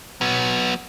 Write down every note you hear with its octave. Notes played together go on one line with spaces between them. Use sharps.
F#3 B3